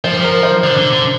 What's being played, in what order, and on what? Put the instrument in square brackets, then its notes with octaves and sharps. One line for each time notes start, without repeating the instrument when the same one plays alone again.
[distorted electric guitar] F3 [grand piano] C5
[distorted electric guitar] G3
F3
[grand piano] A#4
C5
[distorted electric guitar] D3
D3
D3